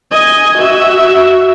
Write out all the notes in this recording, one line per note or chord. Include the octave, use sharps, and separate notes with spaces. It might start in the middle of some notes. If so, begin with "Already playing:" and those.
D#5 G#5
F#4 E5